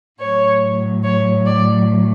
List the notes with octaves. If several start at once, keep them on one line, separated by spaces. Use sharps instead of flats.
A2 F#3 C#5
C#5
D5